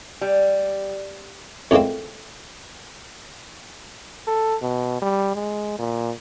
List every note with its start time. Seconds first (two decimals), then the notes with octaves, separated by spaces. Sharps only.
0.21 G3
1.71 F2 A2 G#3 A#3 C4
4.27 A4
4.62 B2
5.02 G3
5.35 G#3
5.79 A#2